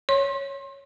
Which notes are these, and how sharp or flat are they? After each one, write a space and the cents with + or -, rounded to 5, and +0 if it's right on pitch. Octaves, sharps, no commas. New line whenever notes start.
C#5 +0 C6 +35